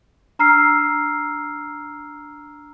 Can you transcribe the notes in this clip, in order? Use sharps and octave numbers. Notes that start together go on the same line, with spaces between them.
D4 A#5 E6 F6 C7